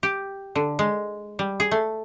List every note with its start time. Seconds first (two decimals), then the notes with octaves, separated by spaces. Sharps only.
0.03 G4
0.55 D3
0.79 G#3
1.39 G3
1.60 G#4
1.71 A3